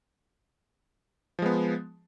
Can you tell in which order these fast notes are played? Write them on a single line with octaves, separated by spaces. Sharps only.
F3 G#3 B3